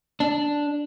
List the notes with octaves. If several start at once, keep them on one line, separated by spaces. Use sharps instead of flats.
D4